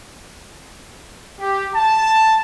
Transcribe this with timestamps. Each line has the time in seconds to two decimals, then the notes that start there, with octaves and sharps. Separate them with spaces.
1.40 G4
1.75 A5